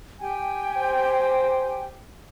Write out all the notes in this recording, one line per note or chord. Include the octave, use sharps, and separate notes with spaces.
G4 G5 G#5
C5